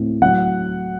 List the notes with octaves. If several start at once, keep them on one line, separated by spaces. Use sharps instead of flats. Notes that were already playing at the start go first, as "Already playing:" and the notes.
Already playing: A2 C4
F#3 F#5